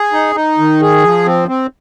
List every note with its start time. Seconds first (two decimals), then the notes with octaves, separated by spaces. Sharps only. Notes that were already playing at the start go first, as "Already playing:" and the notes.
Already playing: G#4
0.13 D#4
0.35 D#4
0.58 D#3
0.81 G#4
1.03 F3
1.26 C4
1.48 C4